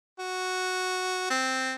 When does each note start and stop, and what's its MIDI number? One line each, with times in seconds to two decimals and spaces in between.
0.19 1.26 66
1.30 1.75 60